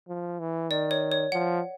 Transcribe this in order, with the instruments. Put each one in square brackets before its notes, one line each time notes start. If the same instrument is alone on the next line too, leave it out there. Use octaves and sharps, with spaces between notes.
[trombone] F3
E3
[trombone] D#3 [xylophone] D5
[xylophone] C#5
C#5
[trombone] F3 [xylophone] F#5